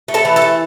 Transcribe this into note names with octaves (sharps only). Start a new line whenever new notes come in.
A3
A4 A5
E3
A4 A5
A3